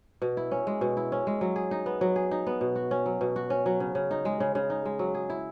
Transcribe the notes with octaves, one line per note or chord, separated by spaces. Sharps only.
B2
E4
C#4
G#3
B2
E4
C#4
G#3
F#3
G#4
D#4
B3
F#3
G#4
D#4
B3
B2
F#4
C#4
F#3
B2
F#4
C#4
F#3
C#3
C#3
D#4
G#3
C#3
C#3
D#4
G#3
F#3
G#4
E4